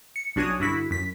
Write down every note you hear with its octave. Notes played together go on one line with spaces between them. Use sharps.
C#7
B1 D4 F#4 C#5 G#5 D#6
G2 D3 E4 F#4 B6
F#2 B6